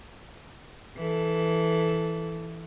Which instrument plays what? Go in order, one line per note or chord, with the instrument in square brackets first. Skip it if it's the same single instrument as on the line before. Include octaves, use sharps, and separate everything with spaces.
[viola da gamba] E3 A4